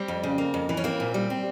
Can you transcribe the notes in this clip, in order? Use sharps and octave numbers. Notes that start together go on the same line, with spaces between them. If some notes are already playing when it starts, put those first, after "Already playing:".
Already playing: G3 C4
F2
C#3
A#3
F2
E3
C#4
A#3 C4
A#2
G3
C4